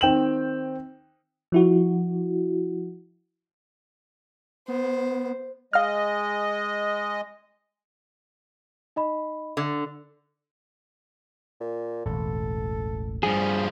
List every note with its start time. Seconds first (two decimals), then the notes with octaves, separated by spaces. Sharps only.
0.01 D#3 C4 G5 E7 F#7
1.52 F3 E4 F#4
4.68 B3 C5
5.73 G#3 D#5 F5 F6
8.96 D#4 D#5 B5
9.57 D3
11.60 A#2
12.06 E1 A1 A4
13.23 G2 F3 G3 G#4